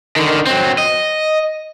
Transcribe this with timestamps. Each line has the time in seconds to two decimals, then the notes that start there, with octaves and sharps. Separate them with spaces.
0.16 D3 D#3
0.46 F#3 C4
0.78 D#5